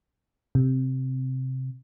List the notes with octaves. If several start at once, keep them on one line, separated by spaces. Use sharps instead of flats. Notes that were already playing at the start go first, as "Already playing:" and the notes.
C3